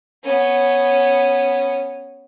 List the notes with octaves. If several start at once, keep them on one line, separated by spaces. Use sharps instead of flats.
B3 C#4